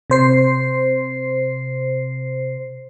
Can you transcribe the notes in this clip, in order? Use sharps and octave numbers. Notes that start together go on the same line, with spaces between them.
C3 C5 C7